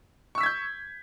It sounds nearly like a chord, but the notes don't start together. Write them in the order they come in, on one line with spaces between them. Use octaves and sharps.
C#6 E6 B6 G#6 G6